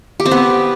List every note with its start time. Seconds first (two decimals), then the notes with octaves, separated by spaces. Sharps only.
0.20 G4
0.25 C4
0.31 B3